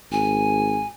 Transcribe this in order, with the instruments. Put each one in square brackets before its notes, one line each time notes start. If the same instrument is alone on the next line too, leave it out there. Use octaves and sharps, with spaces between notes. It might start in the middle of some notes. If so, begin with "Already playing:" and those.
[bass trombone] G#1 [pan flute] G#5